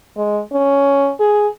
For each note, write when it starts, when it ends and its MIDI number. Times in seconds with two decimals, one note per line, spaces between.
0.17 0.41 56
0.52 1.13 61
1.20 1.48 68